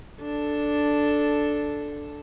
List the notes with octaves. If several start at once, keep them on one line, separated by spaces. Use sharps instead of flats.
D4 A4